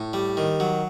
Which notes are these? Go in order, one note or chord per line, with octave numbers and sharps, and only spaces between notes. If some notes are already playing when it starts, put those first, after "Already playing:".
Already playing: A2
G3
D#3
F#3